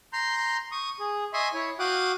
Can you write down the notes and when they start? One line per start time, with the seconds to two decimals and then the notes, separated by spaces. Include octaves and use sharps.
0.13 A#5 C6 G6
0.72 C#6 D#6
1.00 G#4
1.34 D#5 E5 G#5 C6 C#6 D#6
1.54 E4 C#5
1.79 F#4 F5 G5 D6 D#6 F#6